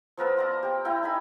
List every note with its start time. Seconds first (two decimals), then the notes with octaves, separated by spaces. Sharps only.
0.17 F3 B3 A#4 E6
0.37 D5 A#5 C6
0.63 G4 D5
0.85 E4 G5 A#5
1.03 D#4 G#5 B5